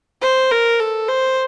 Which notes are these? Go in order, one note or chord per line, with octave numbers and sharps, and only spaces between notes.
C5
A#4
A4
C5